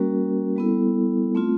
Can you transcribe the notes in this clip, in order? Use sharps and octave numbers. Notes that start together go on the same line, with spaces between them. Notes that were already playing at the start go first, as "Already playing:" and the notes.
Already playing: G3 A#3 C#4 F#4 A#4
G3 B3 E4 A4
A3 C4 F4